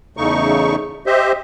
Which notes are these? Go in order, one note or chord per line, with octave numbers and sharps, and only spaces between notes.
E2 C#3 A3 D#4 C#6
G4 C5 D#5 E5